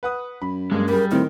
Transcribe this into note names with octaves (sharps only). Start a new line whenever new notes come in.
B4 F#5 D#6
F#2 B5
G2 G#3 A#3
G3 G#4 A#4 B5
A2 D#3 C4